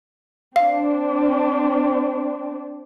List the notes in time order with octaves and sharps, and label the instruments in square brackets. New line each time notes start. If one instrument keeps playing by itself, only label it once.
[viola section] C4 D4 [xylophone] F5